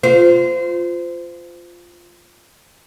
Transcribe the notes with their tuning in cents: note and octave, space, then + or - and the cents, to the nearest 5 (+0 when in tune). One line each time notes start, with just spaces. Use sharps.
F4 +0 C5 -25